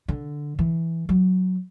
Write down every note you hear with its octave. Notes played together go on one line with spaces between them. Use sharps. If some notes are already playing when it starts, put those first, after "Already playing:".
D3
E3
F#3